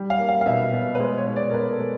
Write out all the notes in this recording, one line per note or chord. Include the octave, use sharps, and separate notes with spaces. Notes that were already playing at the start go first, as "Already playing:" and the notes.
Already playing: G3
F5
A#3
F5
F5
B2 E5
B2
B4
G#3 C5
C#5
B2
D5
A#4
B2 B4
A4
G#3